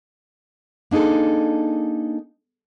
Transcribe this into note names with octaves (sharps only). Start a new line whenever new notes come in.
A#3 D4 D#4 G#4 A4